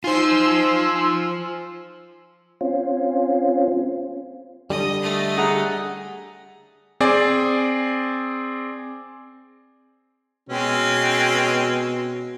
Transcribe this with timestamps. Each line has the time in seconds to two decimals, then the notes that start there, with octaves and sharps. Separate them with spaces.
0.04 D#4 F4 C5 G#5 C6 E6
2.61 C4 C#4 F4
4.70 D3 G3 D#5
5.01 A3 D#5
5.37 G#4 F#5 A#5
7.00 C4 G#4 D5
10.49 B2 G#3 C4 C#4